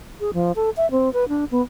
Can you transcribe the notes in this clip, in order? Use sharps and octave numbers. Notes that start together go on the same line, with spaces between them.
G#4
F3
A4
E5
C4
B4
D4
B3